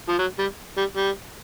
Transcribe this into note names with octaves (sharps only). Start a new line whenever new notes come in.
F3
F#3
G3
G3
G3